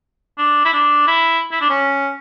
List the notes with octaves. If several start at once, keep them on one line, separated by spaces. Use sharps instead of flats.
D4
E4
D4
E4
E4
D4
C#4